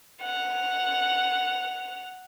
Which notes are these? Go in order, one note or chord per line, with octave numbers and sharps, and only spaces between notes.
F#5 F7